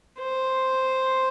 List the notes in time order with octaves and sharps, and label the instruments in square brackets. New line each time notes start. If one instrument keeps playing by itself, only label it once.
[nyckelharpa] C5